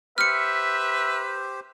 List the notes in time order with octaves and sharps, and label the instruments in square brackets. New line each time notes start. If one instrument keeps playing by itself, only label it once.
[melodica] G4 C5 [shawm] B4 [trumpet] E5 [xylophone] F6 C#7